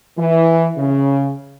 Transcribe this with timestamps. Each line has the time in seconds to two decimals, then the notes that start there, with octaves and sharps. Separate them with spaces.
0.18 E3
0.77 C#3